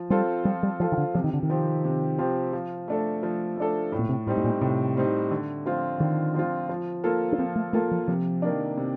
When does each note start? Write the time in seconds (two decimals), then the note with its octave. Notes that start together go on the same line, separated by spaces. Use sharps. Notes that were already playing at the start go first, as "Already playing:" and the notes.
Already playing: F3
0.10 G3 C4 F4 A4
0.45 F3 G3
0.63 G3
0.80 F3 C4 F4 A4
0.92 D#3
0.97 D3
1.14 C3 F3
1.24 D#3
1.33 D3
1.43 D#3
1.49 F3 C4 G4
1.85 C3
2.18 F3 C4 G4
2.53 F3
2.88 A3 D4 A4
3.23 F3
3.57 A3 D4 A4
3.92 A2
3.99 A#2
4.09 C3
4.27 A2 G3 C4 D#4
4.37 A2
4.44 A#2
4.61 A2 C3
4.96 G3 C4 D#4
5.31 D3
5.66 F3 C4 F4
6.00 D3 D#3
6.34 F3 C4 F4
6.69 F3
7.04 A#3 F4 A4
7.32 D4
7.38 F3 C4
7.56 A3
7.73 A3 A#3 F4 A4
7.91 F3
8.08 C3 F3
8.42 D#3 A#3 D4
8.77 C3